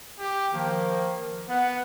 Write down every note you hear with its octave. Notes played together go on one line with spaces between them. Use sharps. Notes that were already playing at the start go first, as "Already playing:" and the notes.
G4
D#3 F3 A#3
B3 F#5